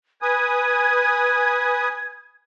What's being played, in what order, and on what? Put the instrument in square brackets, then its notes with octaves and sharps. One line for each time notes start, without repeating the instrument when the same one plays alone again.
[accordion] B4 G#5 D#6 [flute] G#6